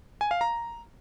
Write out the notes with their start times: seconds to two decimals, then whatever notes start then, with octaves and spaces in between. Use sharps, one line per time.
0.21 G#5
0.31 F5
0.41 A#5